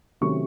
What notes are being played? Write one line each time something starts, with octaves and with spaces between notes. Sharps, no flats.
C3 D#3 F#3 A3 C#4 C#6